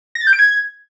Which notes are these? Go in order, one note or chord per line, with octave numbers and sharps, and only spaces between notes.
A#6
A6
G6
D7
G#6